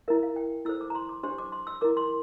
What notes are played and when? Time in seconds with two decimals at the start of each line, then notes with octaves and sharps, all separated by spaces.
0.08 E4 A#4 E5
0.23 F5
0.36 G5
0.65 E4 A4 C5 E6
0.81 D6
0.90 A#5
0.95 C6
1.09 D6
1.23 D4 G4 C5 C6
1.38 D6
1.52 C6
1.67 E6
1.81 E4 A#4 D6
1.97 C6